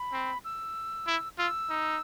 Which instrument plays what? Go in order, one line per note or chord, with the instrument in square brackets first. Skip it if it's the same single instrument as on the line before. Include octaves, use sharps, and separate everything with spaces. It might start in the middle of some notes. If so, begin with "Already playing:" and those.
Already playing: [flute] B5
[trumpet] C4
[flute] E6
[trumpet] E4
[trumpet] F4 [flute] E6
[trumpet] D#4